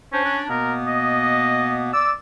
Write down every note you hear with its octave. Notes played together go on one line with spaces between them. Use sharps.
C#4 D4 C5
D4
B2 A#3 B3 A#4
D#5
D5 E6